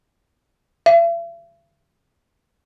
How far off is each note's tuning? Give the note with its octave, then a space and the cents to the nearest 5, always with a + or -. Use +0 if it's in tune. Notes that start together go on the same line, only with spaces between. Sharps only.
E5 +45